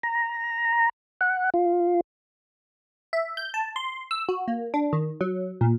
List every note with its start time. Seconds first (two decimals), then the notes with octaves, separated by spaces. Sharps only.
0.03 A#5
1.21 F#5
1.54 F4
3.13 E5
3.37 G6
3.54 A5
3.76 C6
4.11 E6
4.29 F#4
4.48 A#3
4.74 D4
4.93 D#3
5.21 F#3
5.61 A#2